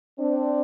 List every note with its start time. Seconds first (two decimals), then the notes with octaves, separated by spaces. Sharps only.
0.19 C4 D4